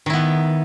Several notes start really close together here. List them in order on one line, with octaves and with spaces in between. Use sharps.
D#3 E4 B3